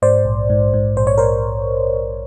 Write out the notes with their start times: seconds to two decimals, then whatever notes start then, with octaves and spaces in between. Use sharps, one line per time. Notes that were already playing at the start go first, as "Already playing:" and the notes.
0.02 G#2 C5 D5
0.25 A#1
0.50 G#2
0.74 G#2
0.97 A#1 C5
1.07 C#5
1.18 A#4 C5